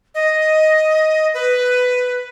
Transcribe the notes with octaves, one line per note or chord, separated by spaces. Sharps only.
D#5
B4